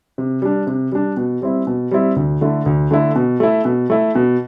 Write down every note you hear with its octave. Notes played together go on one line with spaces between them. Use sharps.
C3
G3 D4
C3
G3 D4
B2
G3 C4 E4
B2
G3 C4 E4
D2
D3 A3 E4
D2
D3 A3 E4
B2
A3 E4
B2
A3 E4
B2